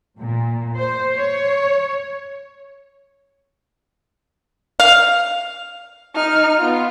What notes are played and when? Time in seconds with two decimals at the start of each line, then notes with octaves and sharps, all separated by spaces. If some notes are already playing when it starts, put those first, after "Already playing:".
0.18 A#2
0.77 C5
1.15 C#5
4.80 F5
6.14 D#4 F6
6.58 B3 F4